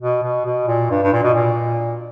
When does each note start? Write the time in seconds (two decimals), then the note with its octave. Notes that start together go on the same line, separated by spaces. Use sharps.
0.01 B2
0.23 B2
0.46 B2
0.67 A#2
0.90 G2
1.02 G2
1.12 A#2
1.23 B2
1.34 A#2